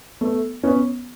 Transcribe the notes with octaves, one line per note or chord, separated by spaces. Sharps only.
A3 B3
B3 C#4